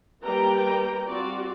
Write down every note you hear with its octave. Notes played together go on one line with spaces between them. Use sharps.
D#3 G3 A#3 B4 G5 A#5
G3 C4 F4 F#4 D5